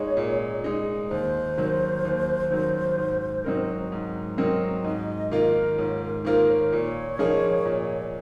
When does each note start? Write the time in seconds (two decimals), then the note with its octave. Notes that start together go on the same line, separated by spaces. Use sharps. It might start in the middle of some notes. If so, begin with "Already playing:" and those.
Already playing: A#2 G#3 D#4 C#5
0.17 A#2
0.64 G#3 D#4
1.10 D#2 C5
1.57 D#3 F#3
2.05 D#2
2.51 D#3 F#3
2.98 G#2
3.44 F#3 C4 D#4 A#4
3.92 G#2
4.38 F#3 C4 D#4 A#4
4.84 G#2 D#5
5.31 D#3 A#3 F4 A#4
5.78 G#2 C#5
6.02 A#4
6.25 D#3 A#3 F4 A#4 C5
6.49 C#5
6.73 A#2 C#5
7.19 F3 A#3 D#4 G#4
7.65 A#2